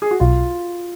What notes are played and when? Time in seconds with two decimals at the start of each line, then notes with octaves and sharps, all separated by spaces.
0.02 G#4
0.11 F#4
0.20 B1 F4